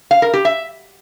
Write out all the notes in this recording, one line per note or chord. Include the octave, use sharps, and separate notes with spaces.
F5
A#4
G4
E5